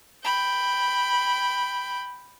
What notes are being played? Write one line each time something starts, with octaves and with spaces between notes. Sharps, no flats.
G5 B5